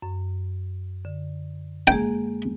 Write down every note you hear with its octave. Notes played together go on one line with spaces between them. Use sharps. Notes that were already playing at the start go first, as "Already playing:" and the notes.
F#2
D3
G#3 A#3 G#4 G5